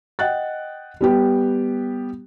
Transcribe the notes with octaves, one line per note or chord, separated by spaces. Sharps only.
D#5 F#5 G5 F#6 A6
G3 B3 G4